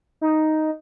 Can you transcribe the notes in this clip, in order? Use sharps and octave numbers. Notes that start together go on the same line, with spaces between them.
D#4